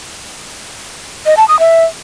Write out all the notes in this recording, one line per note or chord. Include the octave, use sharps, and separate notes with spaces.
D#5
A5
D#6
E5